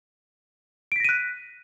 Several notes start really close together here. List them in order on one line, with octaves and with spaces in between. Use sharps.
D7 B6 A#6 D#7 F#6